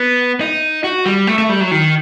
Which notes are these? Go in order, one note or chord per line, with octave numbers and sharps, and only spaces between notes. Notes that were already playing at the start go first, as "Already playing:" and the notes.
Already playing: B3
D#4
F#4
G3
A3
A3
G3
F#3
D#3